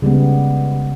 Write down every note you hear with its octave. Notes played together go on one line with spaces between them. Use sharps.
C#3 G3 G#3 B3